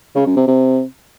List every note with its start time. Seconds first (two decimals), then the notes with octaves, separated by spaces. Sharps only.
0.16 C#3
0.26 F#2
0.37 C3
0.47 C3